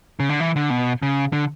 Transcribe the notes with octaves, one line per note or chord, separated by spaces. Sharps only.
C#3
D3
E3
D3
B2
C#3
D3